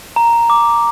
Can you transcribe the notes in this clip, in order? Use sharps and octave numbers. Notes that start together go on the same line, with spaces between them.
A#5
D6